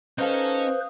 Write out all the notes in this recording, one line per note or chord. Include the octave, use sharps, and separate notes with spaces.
C#4 D#4 A4 B4 C5 D#5 F5